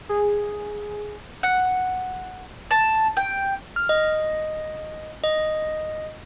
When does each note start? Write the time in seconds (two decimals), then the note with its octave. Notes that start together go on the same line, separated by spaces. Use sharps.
0.09 G#4
1.43 F#5
2.71 A5
3.17 G5
3.76 F6
3.89 D#5
5.24 D#5